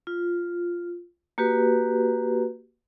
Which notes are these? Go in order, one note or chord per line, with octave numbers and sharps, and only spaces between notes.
F4
A#3 F#4 G4 B4